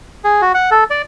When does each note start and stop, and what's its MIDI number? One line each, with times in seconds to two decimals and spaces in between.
0.24 0.41 68
0.42 0.52 66
0.54 0.70 78
0.71 0.84 69
0.90 1.02 74